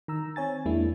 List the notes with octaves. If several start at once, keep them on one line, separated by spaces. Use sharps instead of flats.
D#3 A#5 E6
C4 C#5 G#5 A6
E2 G#3 A#3 D4 E4